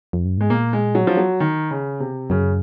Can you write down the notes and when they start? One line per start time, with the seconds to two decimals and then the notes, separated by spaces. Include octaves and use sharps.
0.13 F2
0.25 F#2
0.38 G#2 G#3
0.50 A#2 A#3
0.73 G#3
0.95 F#3
1.07 F3
1.17 F#3
1.40 D#3
1.71 C#3
2.00 C3
2.30 F#2 C#3